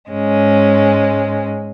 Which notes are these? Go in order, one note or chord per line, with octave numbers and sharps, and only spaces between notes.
G#2 G#3 C#4